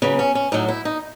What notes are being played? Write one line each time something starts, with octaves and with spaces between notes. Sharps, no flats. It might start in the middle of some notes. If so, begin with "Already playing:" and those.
C#3 F#3 B3
C#4
C#4
A2 F#3 D#4
E4
D#4